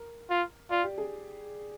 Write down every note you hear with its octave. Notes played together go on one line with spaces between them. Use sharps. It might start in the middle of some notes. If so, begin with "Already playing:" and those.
Already playing: A#4
F4
F4 D5
G4
G#4